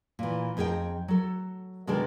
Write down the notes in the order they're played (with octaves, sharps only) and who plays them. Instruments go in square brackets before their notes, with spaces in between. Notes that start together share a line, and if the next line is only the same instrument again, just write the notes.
[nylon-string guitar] A#2 E3
F2 D#4 G#4 A4 G5
F#3 A4
B2 D#3 G#3 D4 A4